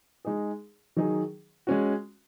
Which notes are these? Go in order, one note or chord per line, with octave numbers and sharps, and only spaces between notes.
G#3 D#4 G#4
D#3 F#3 D#4 G#4
G#3 C#4 F#4